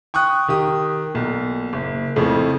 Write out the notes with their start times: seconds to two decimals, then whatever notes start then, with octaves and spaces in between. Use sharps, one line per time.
0.14 G5 C#6 D#6 F#6
0.48 D#3 G4 D#6
1.14 B1 A#2
1.73 F#1
2.16 F2 A2 C#3 F3